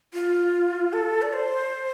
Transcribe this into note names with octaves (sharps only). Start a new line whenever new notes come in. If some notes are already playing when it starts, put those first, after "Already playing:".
F4
A4
D5
C5